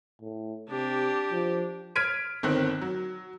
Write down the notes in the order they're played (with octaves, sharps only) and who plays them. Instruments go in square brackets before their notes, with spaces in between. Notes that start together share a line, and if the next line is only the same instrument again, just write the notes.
[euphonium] A2
[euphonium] C3 [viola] D4 G4
[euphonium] F3
[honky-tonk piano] F6 G#6 B6 D7 D#7
G1 D#3 C4 F#6
F#3